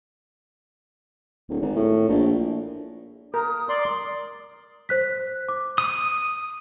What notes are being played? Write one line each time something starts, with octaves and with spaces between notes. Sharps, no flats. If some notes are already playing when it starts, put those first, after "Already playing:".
D1
G#1
A2
A#1
A#4 D#6
D5 C6
C5 F#6 B6
D6
D#6